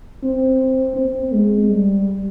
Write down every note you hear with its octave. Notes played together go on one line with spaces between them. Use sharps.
C4
C4
G#3
G3